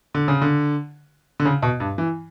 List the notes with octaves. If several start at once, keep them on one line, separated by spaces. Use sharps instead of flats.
D3
C#3
D3
D3
C#3
B2
G2
E3